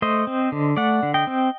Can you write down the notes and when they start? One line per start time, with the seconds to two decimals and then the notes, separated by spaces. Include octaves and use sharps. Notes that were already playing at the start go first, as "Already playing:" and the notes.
0.02 A3 C5 D#5
0.27 C4
0.52 D3
0.77 A3 D5 F#5
1.03 D3
1.14 D#5 G5
1.27 C4